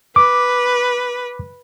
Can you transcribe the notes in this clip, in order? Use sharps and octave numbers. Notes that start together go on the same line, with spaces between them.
B4 D6